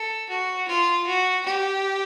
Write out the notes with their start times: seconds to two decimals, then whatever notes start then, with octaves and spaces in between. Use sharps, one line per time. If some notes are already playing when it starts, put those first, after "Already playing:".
Already playing: A4
0.29 F#4
0.68 F4
1.07 F#4
1.45 G4